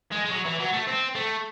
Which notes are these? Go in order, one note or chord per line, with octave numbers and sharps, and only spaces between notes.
G#3
G#3
F#3
E3
F#3
A3
C4
A3